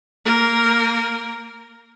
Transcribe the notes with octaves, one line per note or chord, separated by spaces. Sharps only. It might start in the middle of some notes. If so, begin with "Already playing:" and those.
A#3 A#4